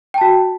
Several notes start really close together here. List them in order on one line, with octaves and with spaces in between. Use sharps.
G5 A5 F#4